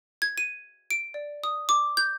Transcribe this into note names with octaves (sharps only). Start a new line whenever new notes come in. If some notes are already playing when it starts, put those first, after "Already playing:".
G#6
D#7
D7
D5
D#6
D6
G6